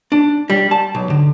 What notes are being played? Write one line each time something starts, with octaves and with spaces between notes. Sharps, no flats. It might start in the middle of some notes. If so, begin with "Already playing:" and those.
D4
G3
A5
B1
D3